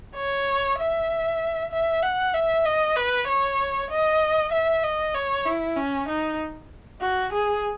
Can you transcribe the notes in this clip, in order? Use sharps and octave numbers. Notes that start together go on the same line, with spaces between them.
C#5
E5
E5
F#5
E5
D#5
B4
C#5
D#5
E5
D#5
C#5
E4
C#4
D#4
F#4
G#4